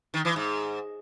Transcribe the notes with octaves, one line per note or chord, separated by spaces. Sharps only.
D#3
E3
G#2